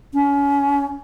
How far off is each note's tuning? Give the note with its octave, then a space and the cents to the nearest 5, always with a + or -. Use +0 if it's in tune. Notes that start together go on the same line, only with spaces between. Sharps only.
C#4 +30